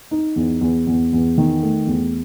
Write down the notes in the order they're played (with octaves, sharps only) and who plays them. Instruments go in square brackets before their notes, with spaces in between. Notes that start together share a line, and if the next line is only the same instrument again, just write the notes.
[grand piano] D#4
E2
E2
E2
E2
D#3
A3
E2